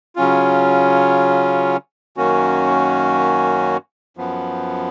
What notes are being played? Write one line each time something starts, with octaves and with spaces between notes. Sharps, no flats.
C#3 F#3 C#4 F4
F#2 D#3 A#3 C#4 F#4
F#2 F3 B3